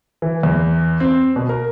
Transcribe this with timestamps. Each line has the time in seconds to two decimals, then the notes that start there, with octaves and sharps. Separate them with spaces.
0.22 E3
0.43 E2
1.00 C4
1.36 B2
1.49 A#4